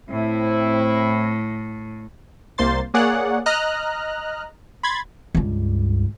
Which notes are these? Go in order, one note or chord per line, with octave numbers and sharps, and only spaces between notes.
A2 C4 E4
C2 A#3 C5 C6 A6
A#3 G#4 C#5 D5 F#5
D#5 A#5 F6 F#6
B5 C6 G#6 A6
C#2 G2